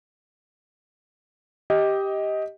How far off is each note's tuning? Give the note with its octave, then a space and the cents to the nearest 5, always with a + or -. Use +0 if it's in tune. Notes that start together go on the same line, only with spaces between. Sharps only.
G4 +0 D#5 +15